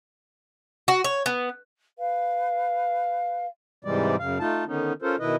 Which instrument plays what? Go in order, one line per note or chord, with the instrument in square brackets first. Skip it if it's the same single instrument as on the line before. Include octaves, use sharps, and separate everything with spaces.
[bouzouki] F#4
C#5
B3
[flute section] B4 F5
[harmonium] G#2 C3 E3 G3 G#3 D5
F#2 C#3 F5
A3 D#4 F4 A5
D3 D#3 B3 C#4 D#4
C#4 F4 A4 A#4 C5
B2 D#3 E4 B4 D#5